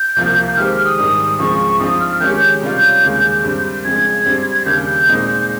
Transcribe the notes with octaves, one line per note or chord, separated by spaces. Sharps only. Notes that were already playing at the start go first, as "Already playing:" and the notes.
Already playing: G6
C2 C3 F3 A#3 F4
D#3 G#3 D#4 G4 C5 F6
F6
D#6
G#2 D#3 G3
C#2 C#3 F3 G#3 C4 C#6
G2 F3 C4 D#4 D#6
F6
D#3 G#3 C#4 G4 C#5 G6
C3 G3 C#4 F4
D#2 C#3 G#3
G2 G3 C4
F2 C#3 G#3 G#6
G2 G3 C4
G#6
D#2 C#3 G3 G6
A#2 G#3 C4 D#4